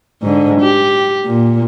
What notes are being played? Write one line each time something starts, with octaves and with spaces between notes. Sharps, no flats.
G#2 D3
G4
A#2